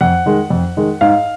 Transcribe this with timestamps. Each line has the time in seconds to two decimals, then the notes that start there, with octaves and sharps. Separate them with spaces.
0.01 F2 F#5
0.26 D#3 G#3
0.50 F2
0.77 D#3 G#3
1.01 G#2 F5